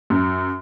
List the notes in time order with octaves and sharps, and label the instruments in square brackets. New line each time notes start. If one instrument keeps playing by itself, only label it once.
[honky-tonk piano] F#2